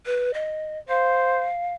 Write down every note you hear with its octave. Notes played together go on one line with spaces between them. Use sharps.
B4
D#5
C5 F5